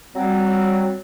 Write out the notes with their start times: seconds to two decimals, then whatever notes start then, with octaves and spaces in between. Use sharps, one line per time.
0.16 F#3 G3 C4